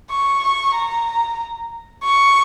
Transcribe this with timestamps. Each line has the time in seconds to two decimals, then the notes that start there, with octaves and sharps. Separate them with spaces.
0.10 C#6
0.43 C#6
0.75 A#5
2.04 C#6